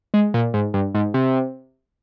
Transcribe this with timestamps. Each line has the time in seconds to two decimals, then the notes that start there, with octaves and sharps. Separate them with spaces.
0.14 G#3
0.34 A#2
0.54 G#2
0.74 G2
0.95 G#2
1.14 C3